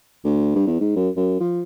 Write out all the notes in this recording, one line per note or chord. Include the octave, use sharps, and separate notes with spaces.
D2
G2
E2
G#2
F#2
F#2
F3